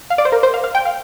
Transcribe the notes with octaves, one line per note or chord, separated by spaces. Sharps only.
F5
D5
C5
A#4
C5
F5
F5
G5
F5